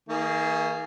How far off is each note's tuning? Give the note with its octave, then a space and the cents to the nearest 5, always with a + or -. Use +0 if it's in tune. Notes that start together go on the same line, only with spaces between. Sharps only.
D#3 +40 A#3 -20 G#4 -5